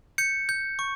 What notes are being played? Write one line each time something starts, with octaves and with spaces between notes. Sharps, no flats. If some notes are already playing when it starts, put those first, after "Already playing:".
G6 C#7
G6
C#6